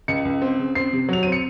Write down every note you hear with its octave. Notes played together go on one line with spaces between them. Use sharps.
C#2 C#7
C#2
C4
C#3
C4 C7
C3
F#3 F7
C4 D#7
C#7